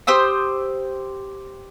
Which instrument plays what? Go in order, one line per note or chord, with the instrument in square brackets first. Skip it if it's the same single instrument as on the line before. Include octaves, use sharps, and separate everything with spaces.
[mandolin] G4 C5 D#6 E6